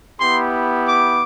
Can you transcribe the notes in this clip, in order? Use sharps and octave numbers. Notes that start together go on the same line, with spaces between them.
B3 E4 G4 C6
D6